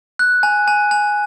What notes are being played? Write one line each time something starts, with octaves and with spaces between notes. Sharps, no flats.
F#6
G#5
G#5
G#5